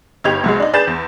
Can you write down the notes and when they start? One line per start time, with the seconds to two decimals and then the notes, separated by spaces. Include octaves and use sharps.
0.24 G1 D#4 G4 G#6 F7
0.44 C2 F#3 G#3
0.60 D4 D#4
0.73 D4 G#4 B4 G6 A6 E7
0.87 E2